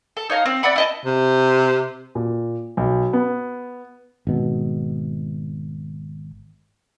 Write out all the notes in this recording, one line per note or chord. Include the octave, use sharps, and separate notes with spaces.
A4
D#4 C#5 F5 A#5
C4
D5 E5 F#5 B5
E4 D#5 A5
C3
A#2
B1
B3
G#1 B2